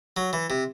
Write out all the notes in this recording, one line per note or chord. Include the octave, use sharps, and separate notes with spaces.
F#3
E3
C3